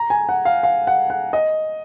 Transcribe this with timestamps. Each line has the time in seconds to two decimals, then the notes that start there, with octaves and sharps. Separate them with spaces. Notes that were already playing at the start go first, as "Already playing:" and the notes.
Already playing: A#5
0.10 G#5
0.29 F#5
0.45 F5
0.63 F5
0.87 F#5
1.10 F#5
1.33 D#5